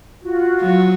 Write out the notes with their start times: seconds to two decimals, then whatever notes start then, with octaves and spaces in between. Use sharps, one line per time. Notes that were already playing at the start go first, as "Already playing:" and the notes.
0.23 F4 F#4
0.61 F#3